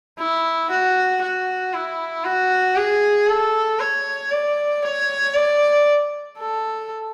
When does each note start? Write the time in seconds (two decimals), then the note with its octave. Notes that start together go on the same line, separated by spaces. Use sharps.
0.18 E4
0.70 F#4
1.22 F#4
1.74 E4
2.25 F#4
2.77 G#4
3.28 A4
3.80 C#5
4.32 D5
4.83 C#5
5.35 D5
6.38 A4